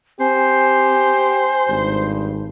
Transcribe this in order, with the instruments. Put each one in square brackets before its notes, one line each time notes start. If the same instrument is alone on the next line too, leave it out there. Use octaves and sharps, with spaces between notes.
[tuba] C4 [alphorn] G4 [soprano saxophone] C5 [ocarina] G#5
[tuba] G#1 [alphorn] G2